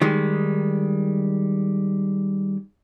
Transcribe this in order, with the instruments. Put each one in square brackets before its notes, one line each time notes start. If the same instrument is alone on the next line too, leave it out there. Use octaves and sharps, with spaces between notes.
[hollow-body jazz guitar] D#3 G3 G#3